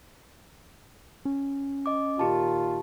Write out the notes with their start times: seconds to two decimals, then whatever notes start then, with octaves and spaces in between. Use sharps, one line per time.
1.25 C#4
1.86 D#5 D6
2.19 A#2 D#3 F4 G4 A5